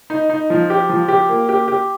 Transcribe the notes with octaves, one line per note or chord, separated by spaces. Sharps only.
D#4
D#4
F3
G4
F3
G4
A#3
G4
G4